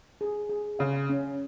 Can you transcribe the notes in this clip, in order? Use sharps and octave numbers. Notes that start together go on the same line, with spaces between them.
G#4
G#4
C#3 F5
C#4